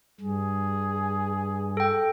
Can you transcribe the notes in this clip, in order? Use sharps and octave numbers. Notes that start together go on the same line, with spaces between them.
G2 G#4
A4 G5